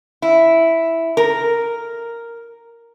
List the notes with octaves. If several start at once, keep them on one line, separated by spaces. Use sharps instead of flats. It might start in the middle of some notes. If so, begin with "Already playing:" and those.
E4
A#4